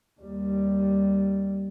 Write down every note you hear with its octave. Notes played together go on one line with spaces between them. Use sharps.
D#2 G3